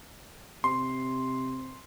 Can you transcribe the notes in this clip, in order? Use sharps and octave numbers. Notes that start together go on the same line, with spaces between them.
C3 C6